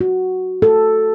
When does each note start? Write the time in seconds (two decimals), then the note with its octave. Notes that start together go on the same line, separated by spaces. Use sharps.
0.01 F#4
0.62 A4